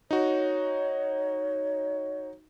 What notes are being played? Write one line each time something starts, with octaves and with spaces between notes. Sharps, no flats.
D#4 F#4 C#5